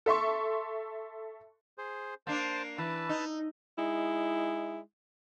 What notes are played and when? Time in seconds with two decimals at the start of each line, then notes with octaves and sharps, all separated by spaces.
0.06 A4 E5 C6 C#6
1.78 G#4 C5
2.27 A#3 D4 C5 A5
2.78 E3 B4 A5
3.09 D#4
3.79 G#3 D#4 E4